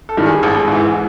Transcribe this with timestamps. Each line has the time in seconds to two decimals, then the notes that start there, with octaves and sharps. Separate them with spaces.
0.09 A4
0.17 G2 D#3
0.26 G#4
0.43 G#1
0.68 G#2 E3